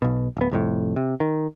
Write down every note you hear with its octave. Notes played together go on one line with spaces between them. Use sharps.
B1 B2
D1 B3
C2 F2 A2
C3
D#3